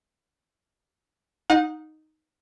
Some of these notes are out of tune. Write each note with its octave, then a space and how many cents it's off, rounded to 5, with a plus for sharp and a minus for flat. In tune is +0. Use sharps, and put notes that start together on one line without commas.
D#4 +0 F#5 -35